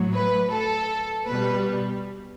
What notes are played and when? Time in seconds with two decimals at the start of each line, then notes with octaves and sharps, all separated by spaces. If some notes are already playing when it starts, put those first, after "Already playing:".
Already playing: A2 F#3
0.14 B4
0.51 A4
1.26 B2 G3 B4